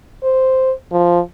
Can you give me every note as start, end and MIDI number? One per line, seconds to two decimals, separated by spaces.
0.23 0.72 72
0.92 1.20 53